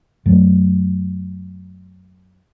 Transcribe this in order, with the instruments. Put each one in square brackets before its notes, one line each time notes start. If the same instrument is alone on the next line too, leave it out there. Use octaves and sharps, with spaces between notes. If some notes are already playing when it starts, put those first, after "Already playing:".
[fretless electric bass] F#2 F#3 A3